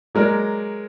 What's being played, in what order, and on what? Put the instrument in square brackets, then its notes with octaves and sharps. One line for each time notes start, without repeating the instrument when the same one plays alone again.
[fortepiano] F#3 G#3 A#4 D5